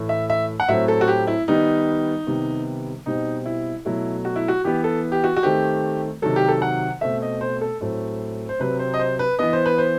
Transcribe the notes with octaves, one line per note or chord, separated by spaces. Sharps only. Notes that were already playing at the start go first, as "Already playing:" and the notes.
Already playing: A2 E3 A3
E5
E5
F#5
A2 F#3 A3 C4 E5
A4
F#4
G4
E4
D#3 G3 B3 D#4
C3 D#3 G3 B3
B2 G3 C4 D#4
E4
B2 F#3 A3 E4
F#4
E4
F#4
E3 B3 G4
A4
G4
F#4
F#4
D#3 A3 C4 G4
C3 D#3 F#3 A4
G4
A4
F#5
B2 A3 C4 E5
D#5
C5
A4
A2 F#3 A3 C4
C5
C3 F#3 C4 B4
C5
D#5
C5
B4
E3 B3 D#5
C5
B4
C5